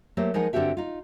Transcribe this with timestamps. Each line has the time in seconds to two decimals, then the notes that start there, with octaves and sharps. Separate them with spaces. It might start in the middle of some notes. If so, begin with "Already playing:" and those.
0.17 F#3 A3 A#3 G4 C5
0.34 F3 G#3 D#4 A#4 F#5
0.53 G2 D3 C4 F#4 G4 E5
0.77 D#4 F4